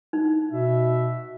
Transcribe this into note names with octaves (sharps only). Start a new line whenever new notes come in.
D#4
B2 E5